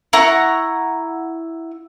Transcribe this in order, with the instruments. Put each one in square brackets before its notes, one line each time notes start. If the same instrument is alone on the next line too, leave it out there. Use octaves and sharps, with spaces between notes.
[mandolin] E4 F#5 A#5 C#6